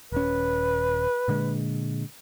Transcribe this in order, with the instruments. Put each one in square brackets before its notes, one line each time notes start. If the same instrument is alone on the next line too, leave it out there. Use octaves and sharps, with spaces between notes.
[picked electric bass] D#1 C#4 [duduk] B4
[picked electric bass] A#2 D3 G#3